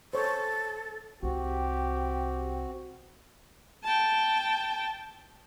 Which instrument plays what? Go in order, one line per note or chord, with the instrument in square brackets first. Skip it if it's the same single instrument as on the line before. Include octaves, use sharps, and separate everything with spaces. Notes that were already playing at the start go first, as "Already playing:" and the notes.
[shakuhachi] A4 [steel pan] C5 C#5
[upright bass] C2 [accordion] C4 F#4 [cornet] G4
[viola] G5 A5